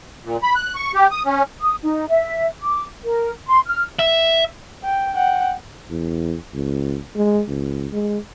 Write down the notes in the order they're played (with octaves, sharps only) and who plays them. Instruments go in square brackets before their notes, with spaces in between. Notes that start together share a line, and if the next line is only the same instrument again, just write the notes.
[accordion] A#2
B5
F#6
C#6
G4
D#6
C#4
[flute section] D#6
D#4
E5
D6
A#4
C6
F6
[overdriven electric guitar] E5
[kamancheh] G5
F#5 G5
[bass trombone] E2
C#2
G#3
C#2
G#3